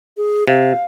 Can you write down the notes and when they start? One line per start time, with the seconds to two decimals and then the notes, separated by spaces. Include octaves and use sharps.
0.17 G#4
0.47 C3 F5